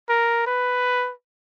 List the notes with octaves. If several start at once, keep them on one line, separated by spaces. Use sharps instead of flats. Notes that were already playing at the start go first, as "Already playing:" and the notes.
A#4
B4